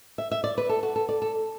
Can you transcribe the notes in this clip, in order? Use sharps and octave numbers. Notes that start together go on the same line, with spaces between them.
E5
E5
D5
B4
A4
F#4
A4
D5
A4